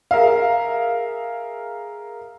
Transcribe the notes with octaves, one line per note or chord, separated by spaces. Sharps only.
G#4 A#4 E5 F5